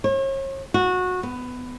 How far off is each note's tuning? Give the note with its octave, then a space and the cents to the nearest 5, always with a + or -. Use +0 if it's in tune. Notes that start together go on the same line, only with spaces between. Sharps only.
C#5 -40
F#4 -20
B3 +15